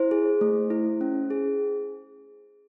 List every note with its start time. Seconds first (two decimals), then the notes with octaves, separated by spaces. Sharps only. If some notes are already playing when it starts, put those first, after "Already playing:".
Already playing: E4 C5
0.11 G#4
0.41 A3
0.70 E4
1.01 C#4
1.30 G#4